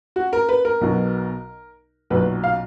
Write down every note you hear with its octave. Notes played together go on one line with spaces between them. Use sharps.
F#4
A#4
B4
A#4
B1 B2 F#3
B1 A#2 F#3 B4
F5